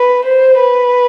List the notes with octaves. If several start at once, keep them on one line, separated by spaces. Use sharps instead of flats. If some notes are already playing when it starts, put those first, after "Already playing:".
Already playing: B4
C5
B4